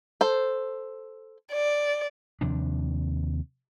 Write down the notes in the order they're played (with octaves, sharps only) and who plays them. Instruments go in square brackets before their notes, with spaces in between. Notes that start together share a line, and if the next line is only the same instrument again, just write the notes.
[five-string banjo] A4 C5
[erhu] D5
[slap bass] D#2 C3 F3 D4